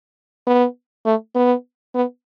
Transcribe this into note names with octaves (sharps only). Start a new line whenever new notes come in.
B3
A3
B3
B3